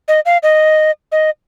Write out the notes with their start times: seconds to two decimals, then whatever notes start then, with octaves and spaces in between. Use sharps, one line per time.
0.08 D#5
0.25 F5
0.43 D#5
1.12 D#5